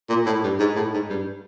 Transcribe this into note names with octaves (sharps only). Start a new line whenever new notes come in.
A#2
A2
G2
G#2
A2
G#2
G2